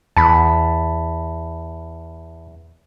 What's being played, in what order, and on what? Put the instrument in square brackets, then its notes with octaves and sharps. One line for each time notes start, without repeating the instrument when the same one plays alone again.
[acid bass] E2 [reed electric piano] A5 B5